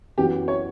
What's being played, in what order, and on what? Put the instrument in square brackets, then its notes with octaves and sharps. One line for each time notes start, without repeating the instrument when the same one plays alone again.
[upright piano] F#2 E3 B3 F#4 [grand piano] G4
[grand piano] C#5